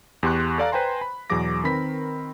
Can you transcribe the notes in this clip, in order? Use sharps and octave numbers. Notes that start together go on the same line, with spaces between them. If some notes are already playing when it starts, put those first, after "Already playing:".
E2 G4 C6 C#6 F#6
A4 D5 F5 A#5
B4 C5 G5 G#5 A#5 C6
B5
E2 B2 F#3 G#4 D6 A#6
D#3 C4 A#4 B4 B5 B6